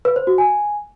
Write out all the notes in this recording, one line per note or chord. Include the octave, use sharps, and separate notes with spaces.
B4
C5
F#4
G#5